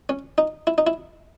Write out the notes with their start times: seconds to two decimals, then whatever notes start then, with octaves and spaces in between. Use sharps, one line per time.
0.09 C#4
0.38 D#4
0.67 E4
0.78 D#4
0.87 E4